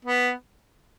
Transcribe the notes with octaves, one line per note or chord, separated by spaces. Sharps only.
B3